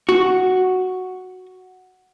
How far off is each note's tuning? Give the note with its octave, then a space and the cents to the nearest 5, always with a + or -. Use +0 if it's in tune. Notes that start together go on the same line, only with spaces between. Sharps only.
F#4 +0